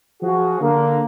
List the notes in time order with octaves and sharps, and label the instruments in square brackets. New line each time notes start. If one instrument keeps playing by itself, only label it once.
[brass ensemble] F3 F#4 G#4
D3 A#3